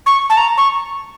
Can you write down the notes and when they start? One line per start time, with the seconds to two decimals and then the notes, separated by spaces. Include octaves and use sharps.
0.06 C#6
0.30 A5
0.37 A#5
0.58 C#6